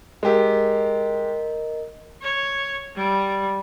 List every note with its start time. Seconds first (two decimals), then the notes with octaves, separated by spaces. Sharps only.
0.23 G#3 G4 A#4 D#5
2.22 C#5
2.96 G3